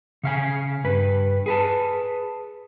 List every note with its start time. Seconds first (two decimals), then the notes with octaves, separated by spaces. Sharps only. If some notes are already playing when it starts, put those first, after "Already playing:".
0.23 C#3 F5 G#5
0.84 G2 B4
1.46 G#4 B4 A5